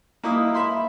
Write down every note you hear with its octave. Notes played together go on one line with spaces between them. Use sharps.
A#3 D#4 E4 D#6
E5 B5 C6